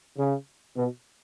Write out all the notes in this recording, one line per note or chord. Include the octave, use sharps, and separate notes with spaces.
C#3
B2